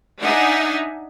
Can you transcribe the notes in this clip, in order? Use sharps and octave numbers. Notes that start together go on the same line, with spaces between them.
D4 D#4 E5 F#5 G#5